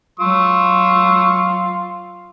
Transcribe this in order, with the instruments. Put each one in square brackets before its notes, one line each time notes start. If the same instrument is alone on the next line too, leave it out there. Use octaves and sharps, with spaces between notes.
[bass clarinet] F#3 [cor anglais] F4 [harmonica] C#6 E6